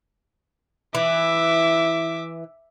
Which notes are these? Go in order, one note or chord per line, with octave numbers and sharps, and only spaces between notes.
E3 E5 D6